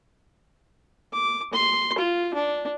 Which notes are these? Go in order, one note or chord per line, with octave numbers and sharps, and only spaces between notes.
D6
C6
F4
D4